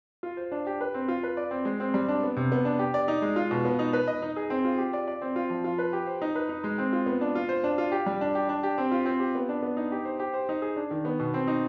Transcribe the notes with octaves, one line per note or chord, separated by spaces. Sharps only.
F4
C5
D4
G4
B4
C4
F4
B4
D5
C4
G#3
C4
G3
D4
B3
C3
B3
D4
G4
D5
D#4
G#3
F4
B2
B3
D#4
B4
D#5
D#4
G#4
C4
F4
G4
D5
D5
C4
F4
F3
F4
B4
G4
C5
D#4
B4
D#4
G#3
C4
F4
B3
D4
F4
C5
D4
F4
G4
G3
D4
G4
D4
G4
C4
F4
C4
G4
B3
D4
B3
D#4
G4
C5
G4
C5
D#4
G#4
D4
D#3
B3
B2
C4
D#4